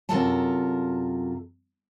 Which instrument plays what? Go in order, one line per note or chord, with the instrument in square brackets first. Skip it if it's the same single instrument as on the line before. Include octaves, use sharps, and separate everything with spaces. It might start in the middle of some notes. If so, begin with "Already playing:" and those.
[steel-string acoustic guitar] F#2 C3 F4 A4 A#4 A5